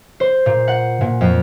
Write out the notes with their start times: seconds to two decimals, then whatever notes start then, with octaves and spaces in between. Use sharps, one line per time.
0.20 C5
0.46 A#2
0.68 F#5
1.01 A#2
1.21 F2